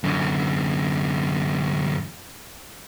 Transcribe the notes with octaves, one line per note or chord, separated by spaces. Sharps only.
F#2 D3